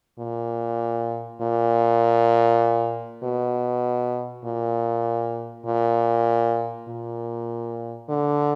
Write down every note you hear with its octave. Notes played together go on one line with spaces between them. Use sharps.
A#2
A#2
B2
A#2
A#2
A#2
D3